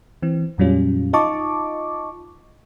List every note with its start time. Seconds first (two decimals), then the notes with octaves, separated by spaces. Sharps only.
0.22 E3 C4
0.58 F2 A#2 F#3 G3 C#4 F4
1.13 D#4 F4 D#5 A5 C#6 D6